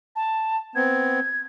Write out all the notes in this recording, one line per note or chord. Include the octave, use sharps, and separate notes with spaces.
A5
B3 C4 G#6